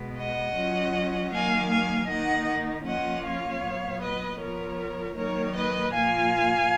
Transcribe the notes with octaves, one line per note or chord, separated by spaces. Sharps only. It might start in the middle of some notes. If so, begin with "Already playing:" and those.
Already playing: B2 G#3 B3
D#5 F#5
F#3 C#4 F4
D#3 F#3 A#3 F5 G#5
F5 G#5
D#3 A#3 D#4 D#5 F#5
F3 A#3 C#4 F4 D#5 F#5
C#5 F5
A#2 F#3 B3
B4 D#5
F3 B3 F4 A#4 C#5
D#3 F#3 A#3 D#4 A#4 C#5
B4 D#5
A#2 F3 A#3 F4 F5 G#5